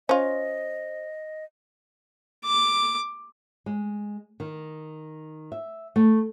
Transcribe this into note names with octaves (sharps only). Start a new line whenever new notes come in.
C#4 F4 C5 D#5
D6
G#3
D#3
E5
A3